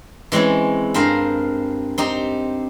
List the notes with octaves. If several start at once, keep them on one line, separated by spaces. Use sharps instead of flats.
E3 G#3 C4 C#4 E4
G2 C4 A#4 C5 F5
C4 D#4 G4